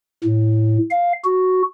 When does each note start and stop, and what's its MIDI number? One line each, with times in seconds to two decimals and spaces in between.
0.24 0.78 45
0.91 1.13 77
1.25 1.62 66